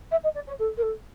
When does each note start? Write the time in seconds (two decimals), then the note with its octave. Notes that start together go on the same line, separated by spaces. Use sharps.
0.11 E5
0.23 D#5
0.35 D5
0.47 C#5
0.59 A4
0.77 A#4
0.82 A4